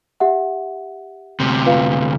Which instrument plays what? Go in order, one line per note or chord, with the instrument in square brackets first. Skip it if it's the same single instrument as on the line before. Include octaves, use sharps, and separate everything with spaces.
[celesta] G4 E5 F#5
[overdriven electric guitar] D2 C3
[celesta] F4 B4 F5